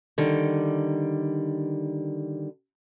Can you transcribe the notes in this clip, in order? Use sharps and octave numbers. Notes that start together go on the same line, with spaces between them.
D3 D#3 G3